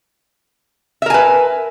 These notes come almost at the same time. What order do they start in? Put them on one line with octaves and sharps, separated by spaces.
E5 A#4 G#5 B4